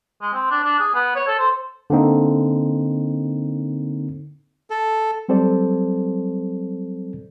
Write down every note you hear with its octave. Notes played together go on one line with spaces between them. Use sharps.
G#3
C4
D4
D4
G#4
B3
C#5
A4
C5
D3 A#3 C4 D#4
A4
F#3 G3 C4 A4 C5 D5